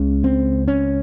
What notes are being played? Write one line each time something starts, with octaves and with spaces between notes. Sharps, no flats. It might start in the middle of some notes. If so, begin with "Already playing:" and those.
Already playing: C#2 C#3
C4
C#4